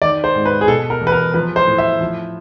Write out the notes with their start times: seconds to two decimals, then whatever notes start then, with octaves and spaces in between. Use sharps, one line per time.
0.02 D#3 D5
0.24 C5
0.35 G#2
0.46 B4
0.61 G#4
0.68 B2 A4
0.90 A#4
1.01 E2
1.07 B4
1.12 A#4
1.34 F3 B4
1.56 C5
1.67 A2
1.78 E5
2.01 F3